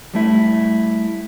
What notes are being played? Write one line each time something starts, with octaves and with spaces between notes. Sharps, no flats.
G3 A3 E4